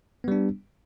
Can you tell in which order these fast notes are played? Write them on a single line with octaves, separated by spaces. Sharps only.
B3 G3 D4